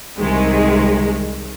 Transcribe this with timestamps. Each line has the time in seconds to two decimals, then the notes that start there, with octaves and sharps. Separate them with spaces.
0.18 C2 C3 D#3 G#3